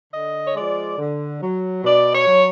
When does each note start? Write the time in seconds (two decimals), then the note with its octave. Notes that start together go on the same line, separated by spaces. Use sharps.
0.13 D3 D#5
0.46 C#5
0.55 F3 G#3 D5
0.98 D3
1.41 F#3
1.84 B2 D5
2.13 C#5
2.27 F#3